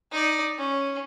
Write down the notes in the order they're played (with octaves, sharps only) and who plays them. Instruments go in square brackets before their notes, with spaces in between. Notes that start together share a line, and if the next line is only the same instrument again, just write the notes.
[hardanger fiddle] D#4 D5
C#4